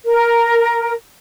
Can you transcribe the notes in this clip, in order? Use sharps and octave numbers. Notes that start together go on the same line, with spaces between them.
A#4